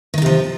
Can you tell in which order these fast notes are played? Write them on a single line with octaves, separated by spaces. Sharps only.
D#3 D#4 C3 F3